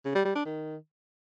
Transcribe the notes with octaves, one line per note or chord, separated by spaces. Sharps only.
C#3
G3
G3
D4
D#3